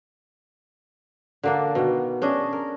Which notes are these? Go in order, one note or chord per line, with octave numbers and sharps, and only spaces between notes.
D3 A#3 D4
B2 D#3
C#4 D4 G#4 D#5
A#4